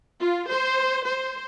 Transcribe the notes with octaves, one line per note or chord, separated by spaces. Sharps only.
F4
C5
C5